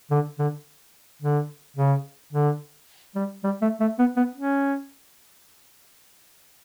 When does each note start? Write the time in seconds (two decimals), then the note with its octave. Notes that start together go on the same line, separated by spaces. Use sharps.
0.11 D3
0.39 D3
1.22 D3
1.76 C#3
2.32 D3
3.15 G3
3.44 G3
3.62 A3
3.80 A3
3.99 B3
4.17 B3
4.36 C#4